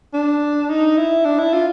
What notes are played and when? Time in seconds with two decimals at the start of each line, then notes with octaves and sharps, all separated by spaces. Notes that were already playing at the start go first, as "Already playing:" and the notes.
0.13 D4
0.70 D#4
0.97 E4
1.25 D4
1.39 E4
1.53 F4